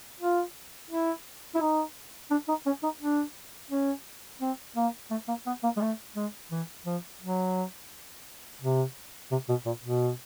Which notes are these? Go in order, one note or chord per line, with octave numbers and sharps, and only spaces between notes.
F4
E4
E4
D#4
D4
D#4
C#4
D#4
D4
C#4
C4
A#3
A3
A#3
B3
A#3
G#3
A3
G#3
E3
F3
F#3
C3
C3
B2
A#2
B2